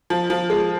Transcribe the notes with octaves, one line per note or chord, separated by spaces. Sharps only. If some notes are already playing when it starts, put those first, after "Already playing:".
F3
F3
G#3